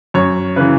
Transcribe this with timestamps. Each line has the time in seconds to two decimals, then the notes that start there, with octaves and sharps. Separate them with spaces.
0.14 F#2 C#5
0.56 C#3 E3 B4